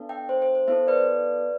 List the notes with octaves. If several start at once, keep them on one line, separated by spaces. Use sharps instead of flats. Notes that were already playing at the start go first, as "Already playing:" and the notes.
Already playing: B3 D4 A4
E5 G5
C5
C5
C5
B3 E4 A4 C5 E5
B4 D5